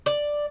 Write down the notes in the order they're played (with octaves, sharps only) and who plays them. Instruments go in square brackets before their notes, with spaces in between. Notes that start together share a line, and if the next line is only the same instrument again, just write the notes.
[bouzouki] D5